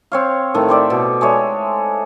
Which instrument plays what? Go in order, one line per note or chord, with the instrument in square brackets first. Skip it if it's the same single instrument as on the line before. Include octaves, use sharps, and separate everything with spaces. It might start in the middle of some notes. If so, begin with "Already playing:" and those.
[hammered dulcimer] C4 C#5 F5
A2 D#3 A3
G4 C5 D5 E5
B2
G#3 A3 C#5 D5